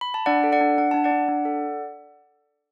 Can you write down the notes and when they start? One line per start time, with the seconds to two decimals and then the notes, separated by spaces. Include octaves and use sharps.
0.01 B5
0.14 A5
0.26 D4 D5 F#5
0.44 A4
0.52 D5 F#5
0.61 D4
0.78 D4 F#5
0.91 D4 A5
1.04 D5 F#5
1.11 D4
1.28 D4
1.45 A4